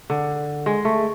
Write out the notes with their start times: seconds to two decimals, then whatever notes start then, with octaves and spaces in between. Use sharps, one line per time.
0.10 D3
0.66 G#3
0.85 A3